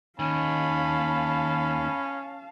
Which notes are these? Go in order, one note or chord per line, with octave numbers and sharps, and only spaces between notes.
D#2 D#3 C#4 F5 A5 B5